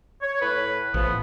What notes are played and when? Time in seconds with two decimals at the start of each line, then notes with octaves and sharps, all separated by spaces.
0.21 C#5
0.40 A2 B4
0.94 A1 A2 F3 B3